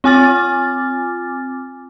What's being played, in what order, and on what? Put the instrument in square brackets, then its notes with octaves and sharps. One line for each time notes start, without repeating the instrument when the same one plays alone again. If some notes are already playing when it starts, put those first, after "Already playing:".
[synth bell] C4 F4 G#5 D6 F6 A6